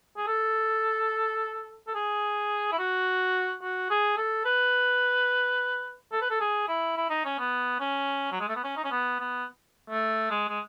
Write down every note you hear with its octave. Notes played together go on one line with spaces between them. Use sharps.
G#4
A4
A4
G#4
E4
F#4
F#4
G#4
A4
B4
A4
B4
A4
G#4
E4
E4
D#4
C#4
B3
C#4
F#3
G#3
A3
B3
C#4
D#4
C#4
B3
B3
A3
G#3
G#3